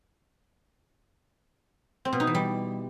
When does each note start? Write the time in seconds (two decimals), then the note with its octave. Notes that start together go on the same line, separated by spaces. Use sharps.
2.05 C4
2.13 B2
2.20 D#4
2.27 E3
2.35 G3